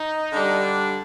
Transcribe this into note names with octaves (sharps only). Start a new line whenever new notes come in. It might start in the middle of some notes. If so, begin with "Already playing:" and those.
Already playing: D#4
D3 G3 D4